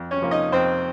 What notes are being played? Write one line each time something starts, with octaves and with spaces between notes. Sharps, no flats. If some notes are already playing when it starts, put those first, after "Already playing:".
Already playing: F2
C#4 C#5
C3 F3 A#3
D#4 D#5
F2 C4 C5